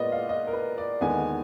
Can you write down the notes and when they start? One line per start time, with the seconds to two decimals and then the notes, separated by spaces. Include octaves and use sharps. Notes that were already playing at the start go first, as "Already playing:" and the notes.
Already playing: A#2 G#3 B3 B4 D5 D#5
0.12 F5
0.29 D#5
0.47 A#4
0.53 B4
0.78 D5
1.01 D#2 D3 G#3 B3 G#5